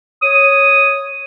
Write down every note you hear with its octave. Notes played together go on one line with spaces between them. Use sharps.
C#5 D#6